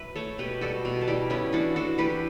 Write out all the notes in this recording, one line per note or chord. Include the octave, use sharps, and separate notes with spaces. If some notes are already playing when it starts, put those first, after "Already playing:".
Already playing: F#3 B4 E5
A3 A4 C#5
B2 G4 B4
G3 F#4 A4
B2
A4
G3 E4 G4
B3 C#4 E4
E3 D4 F#4
E3 F#4 A4
E3 G4 B4